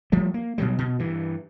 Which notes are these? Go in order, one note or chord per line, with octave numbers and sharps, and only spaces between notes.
F3 G3 A3
A#3
B2 F#3 G3
B2
G2 E3